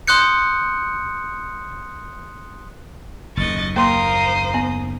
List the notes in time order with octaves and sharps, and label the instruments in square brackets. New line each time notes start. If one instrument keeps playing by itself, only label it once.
[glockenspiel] C6 D#6 F#6 G6 C#7
[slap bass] F#1 D#2 [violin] D#5 A6 [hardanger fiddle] C#6
[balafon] A#3 C6 [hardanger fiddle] A#4 F5 [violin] C5 D#6
[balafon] B3